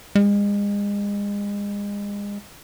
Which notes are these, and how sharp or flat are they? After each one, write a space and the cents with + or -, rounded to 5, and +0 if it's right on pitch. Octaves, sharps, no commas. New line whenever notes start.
G#3 -35